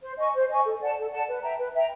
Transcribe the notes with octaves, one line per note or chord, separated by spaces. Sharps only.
C5
D#5 G#5 C#6
C5
D#5 G#5 C#6
A4
D5 F#5 A5
A4
D5 F#5 A5
B4
E5 G5 A#5
B4
E5 G5 A#5